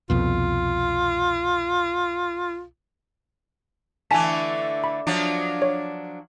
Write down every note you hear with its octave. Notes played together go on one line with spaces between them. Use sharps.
C2 F2 B2 F4
D3 E3 A3 G#5 A5 B6
B5
F3 F#3 D4
C#5